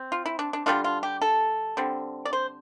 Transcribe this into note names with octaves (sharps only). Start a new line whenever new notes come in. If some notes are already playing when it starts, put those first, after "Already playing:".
Already playing: C4
F4
E4
D4
D4
D3 G3 B3 D4 F4
F4
G4
A4
D3 G3 C4
D5
C5